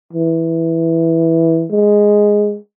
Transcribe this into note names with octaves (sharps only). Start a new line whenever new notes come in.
E3
G#3